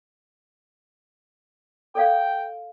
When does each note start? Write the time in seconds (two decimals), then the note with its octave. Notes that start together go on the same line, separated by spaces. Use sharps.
1.95 A4 D5 F5 G5